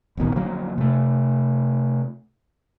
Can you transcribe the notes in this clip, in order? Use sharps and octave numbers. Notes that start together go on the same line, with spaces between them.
D1 A#1 B2 D#3
D3 F3 F#3 A#3
C3 A3